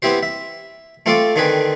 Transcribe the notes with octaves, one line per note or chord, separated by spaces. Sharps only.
B3 C4 E4 G4 C5
E5
A3 C4 F4 A4 F5 D6
D3 D#3 C4 G#4 B4